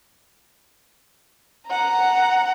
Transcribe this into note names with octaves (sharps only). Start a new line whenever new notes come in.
F#5 A#5